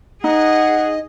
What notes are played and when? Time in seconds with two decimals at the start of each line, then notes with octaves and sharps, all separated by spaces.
0.24 D#4 G#4 D#5 F#5